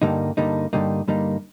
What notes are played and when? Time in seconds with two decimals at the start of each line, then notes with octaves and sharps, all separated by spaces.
0.02 G2 D3 G3 A#3 D#4
0.37 G2 D3 G3 A#3 D#4
0.73 G2 D3 G3 A#3 D#4
1.08 G2 D3 G3 A#3 D#4